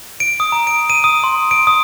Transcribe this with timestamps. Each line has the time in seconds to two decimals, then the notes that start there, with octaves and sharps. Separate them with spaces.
0.20 D7
0.40 D#6
0.52 A#5
0.67 D7
0.90 D#7
1.04 D#6
1.24 C6
1.51 D7
1.67 D#6